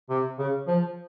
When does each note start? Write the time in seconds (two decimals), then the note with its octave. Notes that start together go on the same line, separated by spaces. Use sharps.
0.10 C3
0.39 C#3
0.67 F3